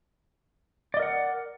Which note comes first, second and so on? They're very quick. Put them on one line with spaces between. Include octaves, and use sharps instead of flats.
D5 D#5 A#4 F#5